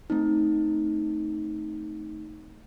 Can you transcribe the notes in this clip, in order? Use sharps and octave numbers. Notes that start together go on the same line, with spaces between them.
A3 C4 D#4